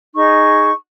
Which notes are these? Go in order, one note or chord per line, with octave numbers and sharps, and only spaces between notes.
D#4 G#4 C#6